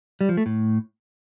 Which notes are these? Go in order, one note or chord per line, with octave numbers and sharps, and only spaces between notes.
G3
F3
A3
A2